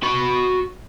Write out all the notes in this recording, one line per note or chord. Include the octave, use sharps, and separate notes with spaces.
F#4 B5